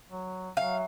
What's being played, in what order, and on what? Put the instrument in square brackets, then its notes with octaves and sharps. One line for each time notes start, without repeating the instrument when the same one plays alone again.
[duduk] F#3
[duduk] F#3 [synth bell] E5 [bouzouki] F5